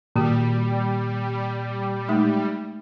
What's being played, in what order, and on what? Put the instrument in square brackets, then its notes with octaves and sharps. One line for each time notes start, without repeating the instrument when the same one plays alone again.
[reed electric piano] A#2 [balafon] D#3 F#4 [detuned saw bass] G3
[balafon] G#3 A3 D#4